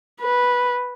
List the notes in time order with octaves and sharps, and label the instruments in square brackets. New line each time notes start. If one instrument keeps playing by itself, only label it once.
[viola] B4